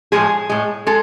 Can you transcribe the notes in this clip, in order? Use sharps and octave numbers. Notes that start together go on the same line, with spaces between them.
A2 F3 G#3 G#4
A2 G#3
G#3 A4